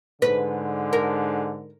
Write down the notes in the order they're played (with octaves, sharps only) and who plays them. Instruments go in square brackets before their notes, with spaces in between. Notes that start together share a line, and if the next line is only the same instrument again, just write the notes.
[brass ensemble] G#2 D3 [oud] B4
[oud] A#4